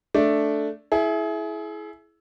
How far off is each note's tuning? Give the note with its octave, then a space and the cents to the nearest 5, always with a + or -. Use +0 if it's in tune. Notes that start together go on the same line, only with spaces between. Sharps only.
A3 +0 D4 +0 D5 +0
E4 +0 G#4 +30